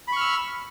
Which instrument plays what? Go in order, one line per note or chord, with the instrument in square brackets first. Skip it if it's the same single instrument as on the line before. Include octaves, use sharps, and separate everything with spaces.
[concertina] B5
C#6
F6
E6